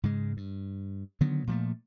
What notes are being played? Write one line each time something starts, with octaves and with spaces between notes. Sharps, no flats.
G#2 C#3 G#3
G2
D3 D#3 F#3 B3
A#2 F3 G#3 A3